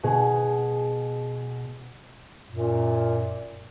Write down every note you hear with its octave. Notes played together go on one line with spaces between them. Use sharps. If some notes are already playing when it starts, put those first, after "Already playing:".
B2 G#4
F#2 A#2